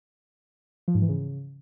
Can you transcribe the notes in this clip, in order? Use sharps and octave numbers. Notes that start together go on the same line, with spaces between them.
F3
G#2
E3
C#3